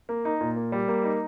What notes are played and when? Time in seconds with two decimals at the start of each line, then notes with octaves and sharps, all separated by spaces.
0.09 A#3
0.25 D#4
0.41 A#2
0.56 A#3
0.72 G3
0.88 A#3
1.04 D#4